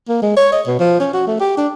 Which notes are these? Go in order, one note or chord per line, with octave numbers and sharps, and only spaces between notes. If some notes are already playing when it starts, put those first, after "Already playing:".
A#3
G#3
C#5
D#5
B2
F3
C#4
F#4
A3
G4
D4